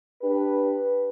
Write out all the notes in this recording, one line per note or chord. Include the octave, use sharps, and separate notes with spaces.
D4 G4 B4